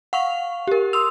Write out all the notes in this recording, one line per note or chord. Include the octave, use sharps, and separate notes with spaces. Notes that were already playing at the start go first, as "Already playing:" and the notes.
F5 F#5 C#6 F7
G4 A#4
C6 D#6 E6 F7